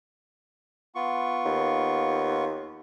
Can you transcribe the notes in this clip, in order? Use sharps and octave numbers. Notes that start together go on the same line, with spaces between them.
B3 F4 C#6
D#2